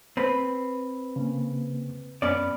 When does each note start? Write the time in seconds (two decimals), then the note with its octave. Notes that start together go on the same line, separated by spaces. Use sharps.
0.17 C4 B4
1.16 C#3 A#3
2.22 F#2 B3 C#4 D5